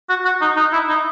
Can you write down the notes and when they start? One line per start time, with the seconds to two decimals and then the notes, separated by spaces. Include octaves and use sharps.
0.09 F#4
0.25 F#4
0.41 D#4
0.56 D#4
0.73 E4
0.89 D#4